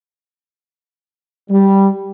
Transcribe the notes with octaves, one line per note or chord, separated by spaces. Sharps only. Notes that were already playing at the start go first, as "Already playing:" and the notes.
G3